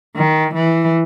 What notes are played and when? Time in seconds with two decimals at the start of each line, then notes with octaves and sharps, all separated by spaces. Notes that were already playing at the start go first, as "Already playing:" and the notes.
0.17 D#3
0.55 E3